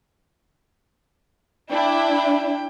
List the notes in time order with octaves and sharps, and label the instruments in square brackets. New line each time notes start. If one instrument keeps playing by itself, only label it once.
[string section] D4 E4 E5 [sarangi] G5